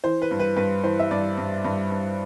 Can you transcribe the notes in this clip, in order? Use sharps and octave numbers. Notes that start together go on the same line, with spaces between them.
E3 C5
B4
G2
B4
G2 B4
E3 C5
E5
G2 D5
G2
G2
G2